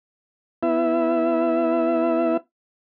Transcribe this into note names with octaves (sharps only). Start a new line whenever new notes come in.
B3 E4 E5